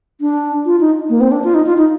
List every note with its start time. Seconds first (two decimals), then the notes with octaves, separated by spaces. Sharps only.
0.21 D4
0.66 F4
0.80 D#4
1.09 A#3
1.21 C4
1.32 D4
1.44 F4
1.54 D#4
1.66 F4
1.78 D#4